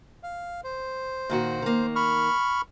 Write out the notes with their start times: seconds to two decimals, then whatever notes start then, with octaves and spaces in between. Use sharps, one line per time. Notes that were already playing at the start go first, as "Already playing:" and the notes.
0.23 F5
0.64 C5
1.30 A#2 D#3 F#4
1.62 D#3 A#3
1.96 B5 C#6 F6